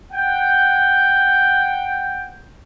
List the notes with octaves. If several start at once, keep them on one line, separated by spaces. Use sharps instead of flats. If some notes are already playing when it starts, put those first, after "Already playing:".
F#5 G5